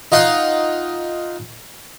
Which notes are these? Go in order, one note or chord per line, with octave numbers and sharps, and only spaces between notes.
D#4 F4 F5 F#5